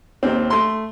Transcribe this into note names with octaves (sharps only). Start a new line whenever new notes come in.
D#2 C4
A3 C6